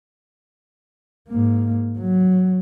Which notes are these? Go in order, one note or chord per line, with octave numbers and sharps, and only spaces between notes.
G#2 A#3
F#3